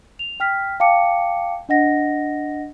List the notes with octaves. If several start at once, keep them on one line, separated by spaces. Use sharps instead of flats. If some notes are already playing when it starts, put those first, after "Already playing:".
F7
G5 F6 B6
F5 G5 A5 D6 C#7
D4 D#5 F#5 A#6